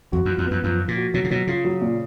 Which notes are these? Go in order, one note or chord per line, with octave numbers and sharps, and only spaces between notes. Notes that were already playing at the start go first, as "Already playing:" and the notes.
F2 F#4
F#2
F3
F2
F#2 B3
F#2 F3
F3
A#2
F#4
B2 F#3
C#3
B2 F#3
C#3 F4
F#3
A#2